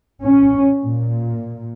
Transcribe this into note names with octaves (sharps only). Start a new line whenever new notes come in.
C#4
A#2